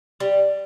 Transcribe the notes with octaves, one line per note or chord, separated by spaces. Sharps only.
G3